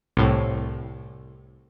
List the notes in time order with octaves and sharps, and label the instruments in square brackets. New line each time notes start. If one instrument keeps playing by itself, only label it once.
[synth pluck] C2 A2